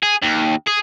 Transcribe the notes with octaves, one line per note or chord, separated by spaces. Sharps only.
G#4
D#2
G#4